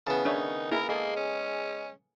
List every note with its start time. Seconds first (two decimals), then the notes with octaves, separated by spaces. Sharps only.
0.07 C#3 E3 B3 A5
0.25 D#3 D4 D#4 C#5 E5
0.71 A#3 E4 G#4 A#4
0.89 G#3 A#3 G#4 A4
1.16 C#4